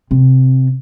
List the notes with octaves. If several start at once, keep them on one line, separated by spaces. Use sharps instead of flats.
C3